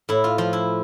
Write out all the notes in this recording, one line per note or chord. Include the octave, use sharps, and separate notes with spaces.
A2 E4
F4
F3 F4
E4